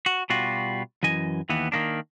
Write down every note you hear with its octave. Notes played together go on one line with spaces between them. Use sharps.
F#4
B2 G3 F4 F#4
F#2 E3 D#5 G#5
D#2 E3 B3
D#3 A#3 D4